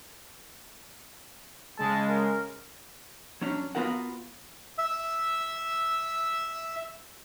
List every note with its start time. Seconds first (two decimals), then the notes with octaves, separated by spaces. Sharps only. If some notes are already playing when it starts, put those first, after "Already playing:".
1.79 C#3 G#3 A5
2.08 A#4
3.41 F#3 C#4 D4
3.75 B3 F4 F#4 A#4 F#5
4.78 E5 E6